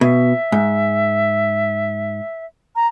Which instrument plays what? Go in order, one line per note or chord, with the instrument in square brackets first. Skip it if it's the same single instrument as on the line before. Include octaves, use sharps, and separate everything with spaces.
[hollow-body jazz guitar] B2 [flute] E5
[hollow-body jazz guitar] G#2
[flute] A#5